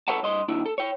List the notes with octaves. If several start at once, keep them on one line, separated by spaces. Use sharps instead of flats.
A4 B4 C#5 F#5 A5
G2 D#5 C6
D#2 D4 E4
A4
C#5 G5